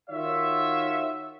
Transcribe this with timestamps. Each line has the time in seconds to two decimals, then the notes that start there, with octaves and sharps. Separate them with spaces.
0.10 D#3 F4 F#4 C#5 E5